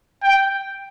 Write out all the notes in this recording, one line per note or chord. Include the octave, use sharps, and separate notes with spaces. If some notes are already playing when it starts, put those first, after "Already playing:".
G5